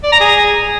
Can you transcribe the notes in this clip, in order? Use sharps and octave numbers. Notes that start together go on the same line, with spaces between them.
D5
A#5
G#4